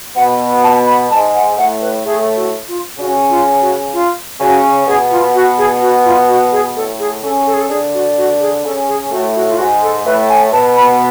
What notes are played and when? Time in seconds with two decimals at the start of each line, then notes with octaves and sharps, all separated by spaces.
0.16 B2 B3 F#5
0.63 A5
0.86 B5
1.10 G#2 G#3 A5
1.34 F#5
1.57 A2 A3 F#5
1.81 B4
2.04 A2 A3 G#4
2.36 F#4
2.68 F4
2.98 C#3 C#4 F#4
3.30 F4
3.61 F#4
3.93 F4
4.40 C#3 C#4 F#4
4.87 B2 B3 G#4
5.11 F4
5.35 F#4
5.58 G#4
5.82 F#4
6.05 F4
6.29 F#4
6.52 G#4
6.76 A2 A3 A4
6.99 G#4
7.23 C#3 C#4 A4
7.46 A4
7.54 G#4
7.60 A4
7.69 D3 D4 G#4
7.94 F#4
8.18 F#4
8.40 G#4
8.64 C#3 C#4 A4
8.88 G#4
9.11 A2 A3 F#4
9.35 F#4
9.49 F4
9.58 G#2 G#3 F#4
9.82 A4
10.05 A2 A3 B4
10.29 G#5
10.52 B2 B3 A5
10.77 B5